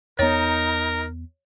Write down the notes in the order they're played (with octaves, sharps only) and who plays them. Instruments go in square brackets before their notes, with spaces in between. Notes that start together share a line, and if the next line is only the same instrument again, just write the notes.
[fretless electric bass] E2 B3 [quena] D#4 [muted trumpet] A#4 [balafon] C#5